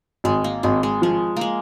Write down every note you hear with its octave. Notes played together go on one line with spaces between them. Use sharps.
G#1 G#3
A#3
G#1 G#3
G#3
F3 G#3
G#3 A#3